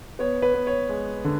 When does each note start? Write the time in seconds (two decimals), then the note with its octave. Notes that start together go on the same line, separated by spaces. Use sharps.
0.19 B3 C#5
0.42 B4
0.54 B3
0.67 C#5
0.89 G#3
1.25 D3